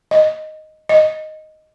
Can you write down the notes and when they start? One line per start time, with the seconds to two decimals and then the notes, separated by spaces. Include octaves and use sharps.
0.11 D#5
0.89 D#5